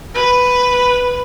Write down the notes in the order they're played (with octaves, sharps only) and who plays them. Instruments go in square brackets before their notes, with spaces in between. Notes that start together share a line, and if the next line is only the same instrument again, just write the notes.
[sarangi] B4